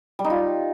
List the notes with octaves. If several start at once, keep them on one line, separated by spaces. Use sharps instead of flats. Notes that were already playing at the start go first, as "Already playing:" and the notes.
G3
D#4
F4